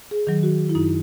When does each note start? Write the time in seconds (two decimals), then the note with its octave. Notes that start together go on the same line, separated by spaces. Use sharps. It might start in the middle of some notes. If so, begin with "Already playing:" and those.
0.11 G#4
0.27 D#3 F#3
0.43 F#4
0.69 E4
0.75 F#2 D#4